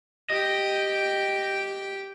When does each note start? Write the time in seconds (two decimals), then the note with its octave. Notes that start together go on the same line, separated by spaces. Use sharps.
0.30 G4 D#5 G5